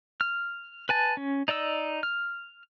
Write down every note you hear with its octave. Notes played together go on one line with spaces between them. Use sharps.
F6
B4 G#5 A5
C#4
D#4 D5 D#5 E6
F6